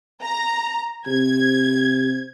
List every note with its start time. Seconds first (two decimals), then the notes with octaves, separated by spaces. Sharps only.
0.24 A#5
1.07 C3 G#6